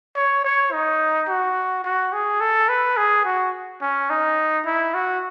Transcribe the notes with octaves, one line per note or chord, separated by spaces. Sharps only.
C#5
C#5
D#4
F#4
F#4
G#4
A4
B4
G#4
F#4
C#4
D#4
E4
F#4